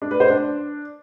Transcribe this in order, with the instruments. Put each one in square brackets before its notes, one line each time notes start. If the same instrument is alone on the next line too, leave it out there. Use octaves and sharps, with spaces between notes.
[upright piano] D4
B4
C5
D4